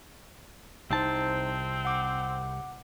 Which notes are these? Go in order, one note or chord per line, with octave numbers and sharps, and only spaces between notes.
C2 C4 D#4 C5 A5
F#5 D6